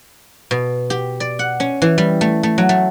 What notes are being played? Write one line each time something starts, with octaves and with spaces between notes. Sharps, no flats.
B2
G4
D5
F#5
C#4
E3
G3
A3
A3
F#3
A3